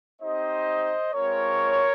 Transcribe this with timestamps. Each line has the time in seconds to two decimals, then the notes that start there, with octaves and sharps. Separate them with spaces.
0.22 C4 D#4 G4 C5 D#5
1.14 G#3 C4 F4 A#4 C#5